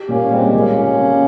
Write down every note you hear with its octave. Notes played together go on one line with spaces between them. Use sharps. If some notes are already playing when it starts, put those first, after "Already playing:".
Already playing: G4
A#2 A#3 C#4
C#4
G3 G#3 C4
C4
C#2 A#3 C#4
C#2
C#3